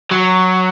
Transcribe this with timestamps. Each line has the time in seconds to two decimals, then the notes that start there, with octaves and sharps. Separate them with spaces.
0.12 F#3